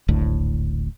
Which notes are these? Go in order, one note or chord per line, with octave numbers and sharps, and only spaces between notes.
D1 G#1 D2 A2